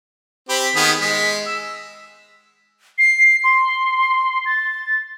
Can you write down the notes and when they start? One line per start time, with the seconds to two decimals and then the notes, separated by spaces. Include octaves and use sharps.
0.49 C4 G4 B5
0.63 B6
0.76 D#3 B3 G#4
1.01 G#3 B6
1.46 E6
2.98 C7
3.44 C6
4.46 A6